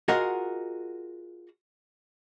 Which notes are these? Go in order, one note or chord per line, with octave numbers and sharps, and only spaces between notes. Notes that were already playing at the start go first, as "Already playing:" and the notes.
F4 F#4 G#4 A#4 D#5 F#5